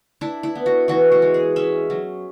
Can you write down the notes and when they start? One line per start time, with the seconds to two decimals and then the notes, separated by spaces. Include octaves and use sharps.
0.21 D4 E4
0.43 E4
0.55 B3
0.66 F#4
0.88 E3 F#4
1.11 F#4
1.22 G#3
1.34 G#4
1.56 C#4 E5
1.90 F#3